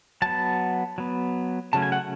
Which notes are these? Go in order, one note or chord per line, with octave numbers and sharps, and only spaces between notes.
F#3 B3 A5
F#3 B3
C#3 F#3 A3 C#4 A5
G#5
F#5